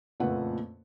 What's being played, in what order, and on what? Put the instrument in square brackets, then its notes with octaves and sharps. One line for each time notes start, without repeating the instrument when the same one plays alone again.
[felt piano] F#1 F2 A#2 A3 B4 F#5